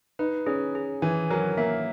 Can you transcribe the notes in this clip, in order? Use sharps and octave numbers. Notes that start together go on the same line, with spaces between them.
D#4 B4
C#4 G#4
G#4
E3 G#5
F#3 A#4
A#3 E5